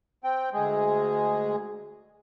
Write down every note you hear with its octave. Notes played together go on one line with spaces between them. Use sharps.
C4 G5
D2 G#3 G#4